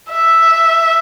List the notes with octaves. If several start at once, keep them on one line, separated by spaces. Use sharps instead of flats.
E5